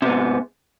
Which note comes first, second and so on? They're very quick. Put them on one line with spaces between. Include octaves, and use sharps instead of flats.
C3 B3 G#2